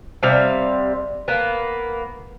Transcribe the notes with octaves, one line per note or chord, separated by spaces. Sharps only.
C3 G3 F5
A#3 B3